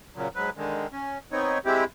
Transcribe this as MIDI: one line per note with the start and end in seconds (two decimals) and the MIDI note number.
0.16 0.28 46
0.16 0.28 49
0.16 0.28 54
0.35 0.50 44
0.35 0.50 54
0.35 0.50 71
0.57 0.87 50
0.57 0.87 51
0.57 0.87 56
0.93 1.18 61
1.32 1.58 59
1.32 1.58 60
1.32 1.58 63
1.32 1.58 73
1.65 1.84 56
1.65 1.84 60
1.65 1.84 64
1.65 1.84 67